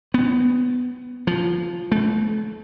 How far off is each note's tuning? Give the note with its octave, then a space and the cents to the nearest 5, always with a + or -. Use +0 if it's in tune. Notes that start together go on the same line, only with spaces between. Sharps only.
B3 +10
F3 -10
A3 -35